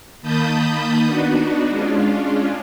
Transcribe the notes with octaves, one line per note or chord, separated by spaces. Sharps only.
D#3 A#3 A5 B5 D#6 G6
B3 D4 D#4 F#4
G#3 C#4 D4 F4